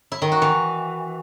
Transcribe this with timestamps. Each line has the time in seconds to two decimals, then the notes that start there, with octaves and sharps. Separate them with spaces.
0.12 E4
0.22 D#3
0.32 F#4
0.42 E3